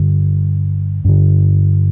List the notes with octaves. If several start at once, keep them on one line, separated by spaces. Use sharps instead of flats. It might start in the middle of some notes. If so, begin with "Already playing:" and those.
Already playing: G2 D3
G2 D3